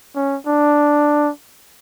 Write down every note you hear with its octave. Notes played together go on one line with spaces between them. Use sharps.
C#4
D4